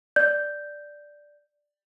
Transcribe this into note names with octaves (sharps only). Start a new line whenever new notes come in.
D5 G6